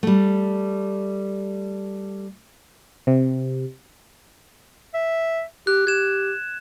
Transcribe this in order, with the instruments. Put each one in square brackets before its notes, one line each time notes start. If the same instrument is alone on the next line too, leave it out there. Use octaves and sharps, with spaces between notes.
[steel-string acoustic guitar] G3 A3
[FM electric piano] C3
[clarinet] E5
[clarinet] G4 [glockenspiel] F#6
[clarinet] G4 [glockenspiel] G#6 E7